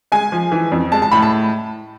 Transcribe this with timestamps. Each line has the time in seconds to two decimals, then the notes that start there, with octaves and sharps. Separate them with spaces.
0.12 G#3 G#5
0.32 F3
0.52 E3
0.72 F2
0.92 G#3 A5
1.02 A5
1.12 A2 B5
1.22 A5